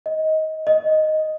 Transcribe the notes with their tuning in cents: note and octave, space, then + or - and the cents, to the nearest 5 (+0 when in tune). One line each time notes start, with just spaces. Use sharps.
D#5 +20
D#5 +0